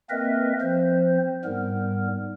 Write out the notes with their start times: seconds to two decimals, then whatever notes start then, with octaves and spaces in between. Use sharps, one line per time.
0.10 A#3 C4 A#4 B4 D#5 E5
0.61 F3 C4 C5
1.44 G#2 G3 B3 A#4